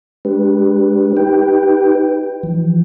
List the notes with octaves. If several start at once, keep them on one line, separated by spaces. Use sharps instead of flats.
G#3 D4 G4 B4
D#4 G4 B4 G5
E3 F3